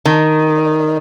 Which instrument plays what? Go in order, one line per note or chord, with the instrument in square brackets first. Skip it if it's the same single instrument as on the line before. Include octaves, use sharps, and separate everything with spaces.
[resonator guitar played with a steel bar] D#3